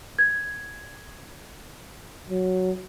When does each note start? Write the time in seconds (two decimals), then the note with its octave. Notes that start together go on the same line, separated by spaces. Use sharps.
0.19 G#6
2.30 F#3